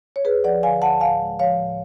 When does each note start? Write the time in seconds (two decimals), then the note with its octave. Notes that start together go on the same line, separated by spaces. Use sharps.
0.16 C#5
0.25 D2 G#4 B4
0.44 F3 D5 F#5
0.63 D3 F5 G#5
0.82 D2 F#5 A5
1.01 A2 F5 G#5
1.20 G#3
1.39 F3 C#5 F5
1.58 A2